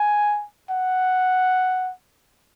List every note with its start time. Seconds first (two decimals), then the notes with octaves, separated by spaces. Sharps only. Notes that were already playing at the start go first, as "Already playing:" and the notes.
Already playing: G#5
0.70 F#5